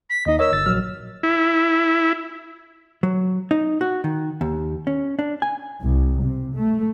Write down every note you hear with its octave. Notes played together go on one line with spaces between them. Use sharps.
B6
D#2 D#4 D#5
A#4 C#5 D#5 E6
G1 A6
A#1 F#3 F6
E4
F#3
D#4
F#4
D#3
D#2
C#4
D4
G#5
C2
C3
A3